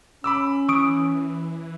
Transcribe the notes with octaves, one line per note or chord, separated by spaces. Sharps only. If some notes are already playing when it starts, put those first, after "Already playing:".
C#4 B5 D6 E6
E3 C#6 D#6 D7